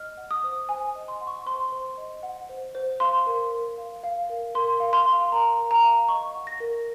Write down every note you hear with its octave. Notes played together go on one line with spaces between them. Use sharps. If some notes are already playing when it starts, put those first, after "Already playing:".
Already playing: D#5 F6
F#5
D#6
C5
C5 G#5
D#5
C6
F#5
C#6
C5 C6
C5
D#5
F#5
C5
C5
F5 C6
A#4
A#4
F5
F5
A#4
A#4 C6
F5
C6
F5
A#4 A#5
A#4
A#5
F5
D#5 C#6
F#5
A#6
A#4